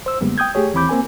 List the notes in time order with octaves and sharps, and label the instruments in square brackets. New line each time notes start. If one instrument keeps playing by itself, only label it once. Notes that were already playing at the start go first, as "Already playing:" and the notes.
[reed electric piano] C5 E6
F#2 D3 G3 G#3 A#3 B3
G5 D#6 G6 G#6
A3 G4 G#4 C#5
D#2 E3 C4 B5 D6 G6
A#3 C4 A#4 G#5